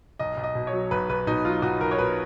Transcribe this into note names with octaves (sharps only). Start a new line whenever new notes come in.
B1 D#5
B1
D#5
B2
C#5
F#3
B1 B4
B1 B4
B2 D#4
F#3 F4
B1 F#4
B1 A#4
C#5
B2 B4